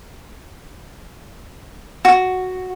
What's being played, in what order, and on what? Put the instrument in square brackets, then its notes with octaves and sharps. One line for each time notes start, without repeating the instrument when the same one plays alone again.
[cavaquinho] F#4